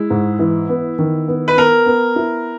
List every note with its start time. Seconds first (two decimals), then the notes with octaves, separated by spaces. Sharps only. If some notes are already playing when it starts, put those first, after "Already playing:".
Already playing: G#3 E4
0.10 G#2
0.39 E3
0.69 B3
0.99 D#3
1.28 B3
1.48 B4
1.57 B3 A#4
1.86 B3
2.16 E4